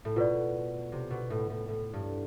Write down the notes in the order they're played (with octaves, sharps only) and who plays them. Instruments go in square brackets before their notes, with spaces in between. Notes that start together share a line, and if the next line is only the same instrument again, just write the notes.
[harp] A2
[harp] B2 [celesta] F4 B4 D5
[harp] C3
B2
A2
A2
A2
G2